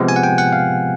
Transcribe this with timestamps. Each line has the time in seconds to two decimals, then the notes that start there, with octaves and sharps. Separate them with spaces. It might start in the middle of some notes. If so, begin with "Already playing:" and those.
Already playing: C3 F3 G#3 B3
0.08 G#5
0.16 F#5
0.23 G5
0.38 F#5
0.53 F5